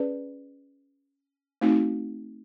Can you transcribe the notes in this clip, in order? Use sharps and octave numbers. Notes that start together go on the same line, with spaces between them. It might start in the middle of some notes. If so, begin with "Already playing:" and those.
Already playing: C#4 G#4 B4 D5
A3 C4 D#4 F#4